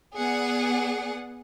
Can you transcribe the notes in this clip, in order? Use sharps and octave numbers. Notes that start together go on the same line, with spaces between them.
B3 G#4 D5 F#5